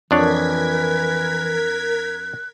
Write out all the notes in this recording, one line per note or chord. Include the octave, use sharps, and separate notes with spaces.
F2 E3 D4 A#4 C#5 F#6 G#6 B6